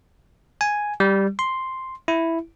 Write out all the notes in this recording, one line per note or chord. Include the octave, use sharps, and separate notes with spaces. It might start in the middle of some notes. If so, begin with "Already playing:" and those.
G#5
G3
C6
E4